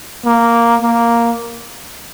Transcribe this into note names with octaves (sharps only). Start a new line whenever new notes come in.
A#3
A#3